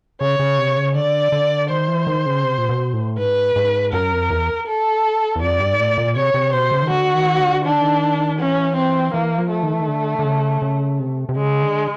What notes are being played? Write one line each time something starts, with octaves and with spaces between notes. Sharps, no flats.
C#3 C#5
C#3
C3
C#3
D3 D5
D3
D#3 C5
E3
D#3
C#3
C3
A#2
B2
A2
G#2 B4
G#2
F#2 A#4
F2
E2
A4
E2
F2 D5
G2
G#2
A2
A#2
C3 C#5
C3
B2 C5
C#3
D#3
D3 F#4
D#3
D3
D#3 D4
D3
D#3
E3 C#4
C4
E3 A#3
F3
A3
D#3
E3
D#3
D3
D3
C#3
C#3
C3
C3
C#3 G#3
D3